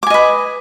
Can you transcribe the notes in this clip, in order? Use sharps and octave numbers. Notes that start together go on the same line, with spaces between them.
B4 D#5 G#5 D6